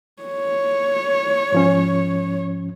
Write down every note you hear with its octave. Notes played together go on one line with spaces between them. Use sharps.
C#5
G#2 F3 C#4